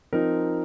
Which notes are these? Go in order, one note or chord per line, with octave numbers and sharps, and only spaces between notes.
F3 C4 D#4 A#4